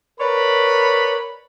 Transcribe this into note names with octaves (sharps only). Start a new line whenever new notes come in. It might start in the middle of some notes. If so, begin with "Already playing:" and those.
A#4 B4 C#5 D5 B5